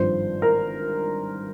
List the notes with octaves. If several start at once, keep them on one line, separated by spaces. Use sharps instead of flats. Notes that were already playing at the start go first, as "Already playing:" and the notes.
Already playing: G#1 G2 F3 C5
A#4